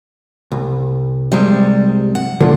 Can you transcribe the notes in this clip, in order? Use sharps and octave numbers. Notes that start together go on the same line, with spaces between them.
C2
C2 C3 G3 G#3
F#5
A#2 D3 F3